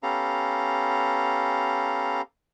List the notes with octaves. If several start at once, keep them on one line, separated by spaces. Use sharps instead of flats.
B3 C#4 G4 A4 F5 A#5